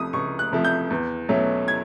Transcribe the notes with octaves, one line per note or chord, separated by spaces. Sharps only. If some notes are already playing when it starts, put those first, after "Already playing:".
Already playing: C#2 C3 F3 A3 D#6
C#2 C#6
F#6
C3 F3 A3
G6
E2
B2 F#3 A3 C#4
G#6